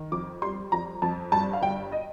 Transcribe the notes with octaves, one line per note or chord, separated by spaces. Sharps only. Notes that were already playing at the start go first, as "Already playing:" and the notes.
Already playing: D#3
F2 D6
G3 C6
F2 A#5
F2 A5
G2 A5
F5
G1 G5
D#5